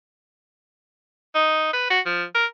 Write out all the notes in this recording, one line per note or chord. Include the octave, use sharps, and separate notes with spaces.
D#4
B4
F#4
F3
A#4